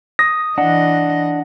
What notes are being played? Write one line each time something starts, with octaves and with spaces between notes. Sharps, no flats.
D#6 A#6
E3 D4 D#5 F#5